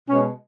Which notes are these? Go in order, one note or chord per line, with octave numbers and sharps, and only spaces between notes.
B2 G#3 C#4